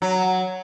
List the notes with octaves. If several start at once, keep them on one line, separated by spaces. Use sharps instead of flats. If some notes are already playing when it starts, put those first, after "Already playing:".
F#3